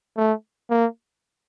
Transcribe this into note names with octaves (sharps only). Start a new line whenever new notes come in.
A3
A#3